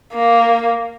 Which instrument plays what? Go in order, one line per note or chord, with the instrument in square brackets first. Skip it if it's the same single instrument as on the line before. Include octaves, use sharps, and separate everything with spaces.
[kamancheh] A#3